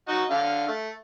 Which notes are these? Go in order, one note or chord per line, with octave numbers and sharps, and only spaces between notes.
D#4 F#4
D3 F5
A3